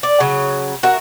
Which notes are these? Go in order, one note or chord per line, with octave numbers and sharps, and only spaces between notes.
D5
C#3 F#3
F#4 A#4 E5